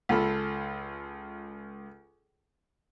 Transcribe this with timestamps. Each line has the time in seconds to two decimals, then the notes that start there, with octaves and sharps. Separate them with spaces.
0.09 C#2 F4 A4 B5